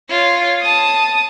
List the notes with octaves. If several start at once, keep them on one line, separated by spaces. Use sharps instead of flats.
F4 C#5
A5 D#6